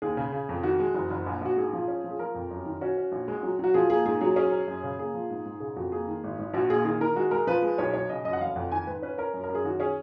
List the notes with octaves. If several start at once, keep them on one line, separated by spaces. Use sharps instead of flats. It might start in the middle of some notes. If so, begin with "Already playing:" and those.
D#2 G#4
C#3
C#3
F2
D#3 F#4
G#3
F#1
F#1
A#1
A#1 F#4
G#2 G#4
F3
C#4
F3
G#4
F3 A#4
F2
F#2
D#3
C#4 F#4
C#4
A#1
G#3
F#3
F#3 F#4
F3 G#4
A#3 G#4
G#2 G#4
F#3 G#4
C#4 G#4
C#4
F#2
C#3
A#3 G#4
F3
G#2
G#2
C#3 G#4
F2 F#4
A#3 G#4
D#3
G#1
G#1
A#1 F#4
A#2 G#4
D#3 G#4
D#3 A#4
G#3 F#4
G#3 A#4
F3 B4
G#3
B1 C#5
B1 C#5
C#3 D#5
F#2 D#5
F#5
F1 F5
F2 F#5
D#3 G#5
G#2 B4
C#4 B4
C#4 A#4
F#2
A#4
F#2
G#4
D#3 F#4
C#4 G#4